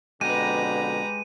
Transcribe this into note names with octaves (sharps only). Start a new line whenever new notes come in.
F2 B2 D3 G#3 G4 B4 A#5 D#7